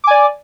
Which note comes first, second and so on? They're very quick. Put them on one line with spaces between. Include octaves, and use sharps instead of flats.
D6 G#5 D5